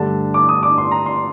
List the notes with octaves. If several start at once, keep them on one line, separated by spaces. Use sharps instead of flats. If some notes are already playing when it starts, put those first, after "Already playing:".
Already playing: G2 D3 A3 D4 A5
D6
D#6
D6
C6
A#5
C6